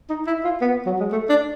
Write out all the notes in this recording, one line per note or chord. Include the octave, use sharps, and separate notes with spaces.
D#4
E4
F4
B3
F#3
G#3
A3
D4